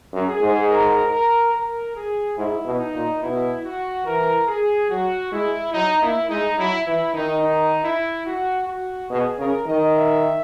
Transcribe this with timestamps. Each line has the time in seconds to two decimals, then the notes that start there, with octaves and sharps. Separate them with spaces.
0.13 F#2
0.28 G#4
0.41 G#2
0.69 A#4
1.11 A#4
1.53 A#4
1.95 G#4
2.37 G#2 E4
2.65 B2
2.79 D#4
2.94 A#2
3.22 B2 E4
3.64 F#4
4.05 E3 A#4
4.48 G#4
4.90 F#3 F#4
5.32 G#3 E4
5.73 F#3 D#4
6.02 A#3 E4
6.30 G#3 D#4
6.58 F#3 E4
6.86 E3 E4
7.14 D#3 D#4
7.42 D#4
7.84 E4
8.26 F#4
8.68 F#4
9.10 B2 G#4
9.39 C#3 A#4
9.66 D#3 D#5
9.95 E5